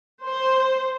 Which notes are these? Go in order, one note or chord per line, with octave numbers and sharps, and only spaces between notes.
C5